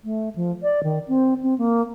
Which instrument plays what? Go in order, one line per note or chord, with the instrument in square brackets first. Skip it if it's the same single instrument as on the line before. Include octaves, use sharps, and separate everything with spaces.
[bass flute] A3
F3
D5
D#3
C4
C4
A#3